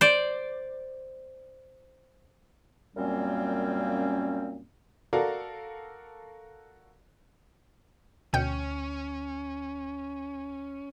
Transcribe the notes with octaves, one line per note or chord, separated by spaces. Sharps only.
C5 D5
F#2 A#2 G3 A#3 C4 C#4
F#4 A4 A#4 D5 F5
D2 B2 C#4 G5 G6